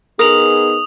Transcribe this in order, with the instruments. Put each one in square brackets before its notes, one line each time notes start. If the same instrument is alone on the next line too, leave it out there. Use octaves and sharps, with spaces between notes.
[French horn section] B3 D#4 G#4 [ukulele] A#4 [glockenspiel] D#6 F7 F#7